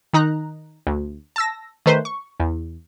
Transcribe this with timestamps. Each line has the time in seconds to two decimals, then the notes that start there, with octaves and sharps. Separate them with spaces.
0.13 D#3 D#4 A#5 F#6
0.87 D2
1.36 A5 E6 A#6
1.86 D#3 A3 B4 C5
2.05 C#6
2.40 E2